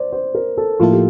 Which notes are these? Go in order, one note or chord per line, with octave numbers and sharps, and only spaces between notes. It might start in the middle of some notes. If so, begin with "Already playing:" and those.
Already playing: C5 D5
C5
A#4
A4
A2 F3 A#3 E4 F4 A4
G4